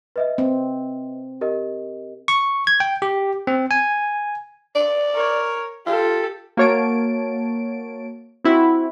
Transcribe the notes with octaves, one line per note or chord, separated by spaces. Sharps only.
B4 D#5 E5
C4
G4 A#4 D#5
C#6
G#6
G5
G4
C4
G#5
D5
A#4 C#5
F4 G4 A4
A#3 F#4 C#5 A5 D7
C4 E4 F#4